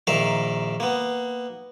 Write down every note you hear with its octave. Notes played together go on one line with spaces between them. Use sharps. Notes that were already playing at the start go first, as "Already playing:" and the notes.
A#1 D#3 A#4 E5 F5
A#3 B3